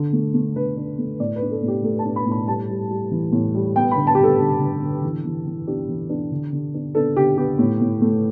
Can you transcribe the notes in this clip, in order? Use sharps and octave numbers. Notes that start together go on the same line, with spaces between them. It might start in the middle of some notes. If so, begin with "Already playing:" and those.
Already playing: D3
A3
A3
D3 B4
D4
A3
A2 D5
B4
D4
A4
A2
G4
A3 A4
A5
D4
B5
A2
B5
G3 A5
G3
G3
E3
A2
G3
B3 G5
D3 B5
A5
G4
G3 A4
D3
D3
D3
E3
E3
E3
D4 G4
E3
D4
D3
D3
D4
D4 A4
D3 G4
B3 G4
A2
A2
A3